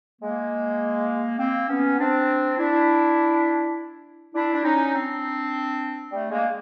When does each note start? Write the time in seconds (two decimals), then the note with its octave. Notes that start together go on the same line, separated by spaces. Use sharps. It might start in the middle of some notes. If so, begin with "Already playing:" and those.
0.21 G#3 A#3
1.39 A#3 C4
1.68 B3 C#4
1.98 C4 D4
2.58 D4 E4
4.34 D4 E4
4.53 D4
4.64 C#4 D#4
4.94 C4 D4
6.11 G3 A3
6.31 G#3 A#3